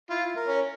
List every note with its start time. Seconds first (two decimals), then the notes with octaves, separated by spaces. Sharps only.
0.10 E4 F4
0.36 A#4
0.48 C#4